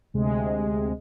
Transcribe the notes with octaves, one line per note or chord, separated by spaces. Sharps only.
D2 C3 G#3